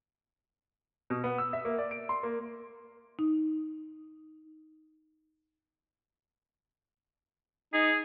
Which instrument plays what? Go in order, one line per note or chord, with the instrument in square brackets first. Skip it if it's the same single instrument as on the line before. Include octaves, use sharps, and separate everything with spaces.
[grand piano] B2
B3
E6
E5
A#3
D5
D7
C6
A#3
[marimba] D#4
[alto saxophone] D#4 [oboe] G#4